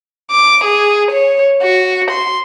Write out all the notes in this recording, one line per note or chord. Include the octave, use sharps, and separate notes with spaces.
D6
G#4
C#5
F#4
C6